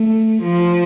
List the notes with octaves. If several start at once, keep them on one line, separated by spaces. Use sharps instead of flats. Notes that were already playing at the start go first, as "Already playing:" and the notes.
Already playing: A3
F3